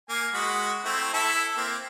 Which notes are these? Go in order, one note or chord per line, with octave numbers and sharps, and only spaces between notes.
A#3 G#5
G#3 F#4 B5
A3 C4 E4
E4 A4 E5
A#3 C4